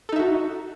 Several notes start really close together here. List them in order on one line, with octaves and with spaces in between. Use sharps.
A4 D#4 E5 F#4